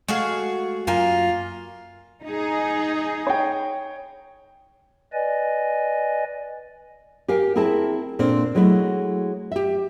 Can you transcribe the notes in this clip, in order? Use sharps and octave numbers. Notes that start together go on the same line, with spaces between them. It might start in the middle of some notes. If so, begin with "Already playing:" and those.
G#3 A3 F#4 G#4 F5
F#2 A#3 F4 G#5
D#4 G#4
C#5 G5
B4 D5 D#5 G#5
G4 A#4 F5 G#5
C4 E4 G#4 A#4 E5 A5
A#2 C4 D4 A4
F#3 G#3 A3 E4
G4 E5